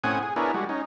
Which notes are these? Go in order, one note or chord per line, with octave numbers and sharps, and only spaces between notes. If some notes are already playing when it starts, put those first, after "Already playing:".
A2 C4 C#4 F#5 G#5 D#6
G#4
B3 D4 E4 G#4 A#4 C#5
G3 G#3 F#4
C#4 D#4